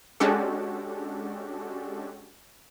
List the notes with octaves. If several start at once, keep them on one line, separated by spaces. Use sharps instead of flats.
G#3 C#4 D4 F#4 G4 A4